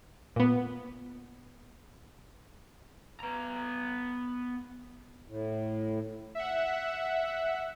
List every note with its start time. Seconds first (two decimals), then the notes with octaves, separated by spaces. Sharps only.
0.36 A#2 B3
3.20 B3 A#5
5.28 A2
6.35 E5 F#5